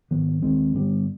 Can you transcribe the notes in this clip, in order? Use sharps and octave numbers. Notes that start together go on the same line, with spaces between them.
G#2 D#3 F#3 B3
D#2 D#3 G#3 C4
G2 D3 G3 B3